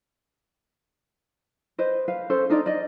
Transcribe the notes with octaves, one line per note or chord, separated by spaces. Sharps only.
B4 C5 D#5
B4 F5
C#4 A4 C5
D4 D#4 A#4 D5
D5 D#5